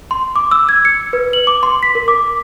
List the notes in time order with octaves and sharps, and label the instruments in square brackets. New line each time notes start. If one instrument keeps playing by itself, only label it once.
[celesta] C6
D6
E6
G#6
C#7
B4
F#7
D6
C6
B6
A#4
D6